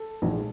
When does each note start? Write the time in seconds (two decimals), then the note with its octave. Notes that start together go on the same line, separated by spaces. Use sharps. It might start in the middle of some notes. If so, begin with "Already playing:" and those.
Already playing: A4
0.22 A#1 G#2 F3 G#3